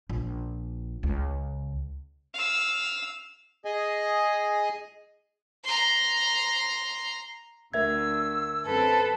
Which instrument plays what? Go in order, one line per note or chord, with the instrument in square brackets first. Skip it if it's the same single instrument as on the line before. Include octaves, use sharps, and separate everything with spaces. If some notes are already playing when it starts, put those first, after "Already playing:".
[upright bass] A#1
C#2
[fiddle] F5 E6
[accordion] G#4 D#5 G#5
[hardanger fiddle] A#5 C6
[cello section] D2 [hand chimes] A#4 E5 G#6 [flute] E6
[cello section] F#2 C4 [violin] A4 [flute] B4